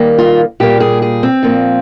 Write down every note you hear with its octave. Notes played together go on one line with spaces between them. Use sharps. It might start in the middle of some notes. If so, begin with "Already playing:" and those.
Already playing: D#3 G3 A#3
F4
A#2 G3 A#3 G4
G#4
G#4
C4
A#2 F3 A#3